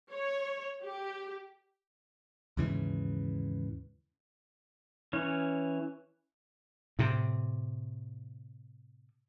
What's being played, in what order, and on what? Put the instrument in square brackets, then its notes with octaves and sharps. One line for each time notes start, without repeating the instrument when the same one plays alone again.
[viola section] C#5
G4
[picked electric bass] D#2 G#2 C#3 E3
[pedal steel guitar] E3 C#4 C#5
[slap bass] A2 C3